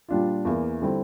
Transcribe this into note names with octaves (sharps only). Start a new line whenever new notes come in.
A#2 G3 D4 F4
E2 E3 A#3
D3 G3 C4 E4